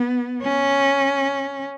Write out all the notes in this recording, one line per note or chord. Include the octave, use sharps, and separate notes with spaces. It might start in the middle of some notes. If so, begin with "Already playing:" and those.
Already playing: B3
C#4